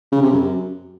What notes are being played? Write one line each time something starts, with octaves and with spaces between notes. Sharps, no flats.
C#3
C3
F#2